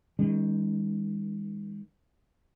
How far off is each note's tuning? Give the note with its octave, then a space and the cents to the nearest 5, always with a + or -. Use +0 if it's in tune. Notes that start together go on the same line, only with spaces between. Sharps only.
D#3 +15 G#3 -40 C#4 +30